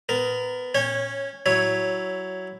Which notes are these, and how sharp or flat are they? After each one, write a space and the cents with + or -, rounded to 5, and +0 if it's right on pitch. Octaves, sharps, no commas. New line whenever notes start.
B3 +25 A#4 +0
C#4 +0 C#5 -15 G5 +40
F#3 +10 E4 +0 C#5 +0